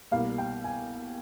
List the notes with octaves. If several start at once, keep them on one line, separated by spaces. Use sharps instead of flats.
C2 B2 G3 A#3 F5
G5
G#5